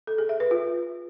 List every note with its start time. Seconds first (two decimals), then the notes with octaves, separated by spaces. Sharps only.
0.07 A4
0.18 G#4
0.29 E5
0.40 B4
0.51 F4